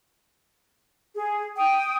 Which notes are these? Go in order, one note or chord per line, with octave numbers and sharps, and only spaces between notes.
G#4
G5 D#6